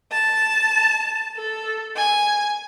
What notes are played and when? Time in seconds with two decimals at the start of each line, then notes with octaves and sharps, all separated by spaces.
0.11 A5
1.37 A4
1.96 G#5